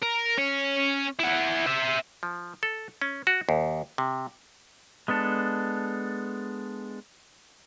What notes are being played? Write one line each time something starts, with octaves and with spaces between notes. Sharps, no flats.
A#4
C#4 C#5
E4 F#5
C5 E5
F3
A4
C#4
F#4
D#2
C3
G#3 B3 D4 A4